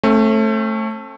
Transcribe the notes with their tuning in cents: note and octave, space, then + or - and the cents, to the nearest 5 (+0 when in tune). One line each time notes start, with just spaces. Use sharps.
A3 +0 C4 +45